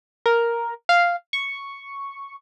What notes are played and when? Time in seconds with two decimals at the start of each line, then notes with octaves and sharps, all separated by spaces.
0.26 A#4
0.89 F5
1.33 C#6